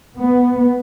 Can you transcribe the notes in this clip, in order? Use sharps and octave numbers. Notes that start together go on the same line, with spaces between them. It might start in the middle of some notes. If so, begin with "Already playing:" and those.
B3